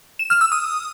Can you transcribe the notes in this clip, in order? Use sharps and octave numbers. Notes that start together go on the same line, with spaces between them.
E7
F6
E6
D#6